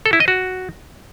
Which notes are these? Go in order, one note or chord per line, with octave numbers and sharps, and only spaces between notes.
A4
E4
D#5
F#4